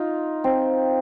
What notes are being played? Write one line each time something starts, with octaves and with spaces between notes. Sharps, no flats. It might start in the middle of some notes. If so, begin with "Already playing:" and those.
Already playing: D#4 F4
C4